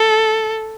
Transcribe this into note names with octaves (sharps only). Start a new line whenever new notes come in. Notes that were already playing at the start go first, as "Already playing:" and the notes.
Already playing: A4